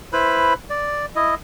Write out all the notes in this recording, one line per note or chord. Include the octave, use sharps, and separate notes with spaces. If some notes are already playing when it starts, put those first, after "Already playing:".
E4 B4 C5 B5
D5
E4 D#5